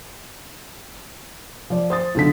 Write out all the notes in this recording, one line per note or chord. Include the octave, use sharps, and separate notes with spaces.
F3 D5
C5 D#6 A6
B1 B2 D3 A4 B6